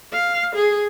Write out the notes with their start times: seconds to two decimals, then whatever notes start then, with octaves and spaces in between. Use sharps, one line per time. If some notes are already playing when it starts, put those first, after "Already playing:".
0.13 F5
0.55 G#4